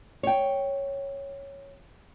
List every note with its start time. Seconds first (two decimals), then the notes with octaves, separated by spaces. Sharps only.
0.23 C#5 G5